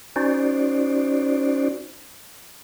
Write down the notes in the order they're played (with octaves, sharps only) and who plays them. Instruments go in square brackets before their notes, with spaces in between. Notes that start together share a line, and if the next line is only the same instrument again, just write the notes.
[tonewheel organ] C#4 D#4 F#4 C5 D5